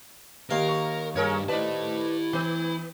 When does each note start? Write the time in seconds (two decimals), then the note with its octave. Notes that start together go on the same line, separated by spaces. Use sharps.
0.51 D#2 A#4 F5
0.68 C#6
1.15 G2 G#4 A#4 C#5
1.48 E4 B4 C5 D5 D#5 A5
2.33 E3 B3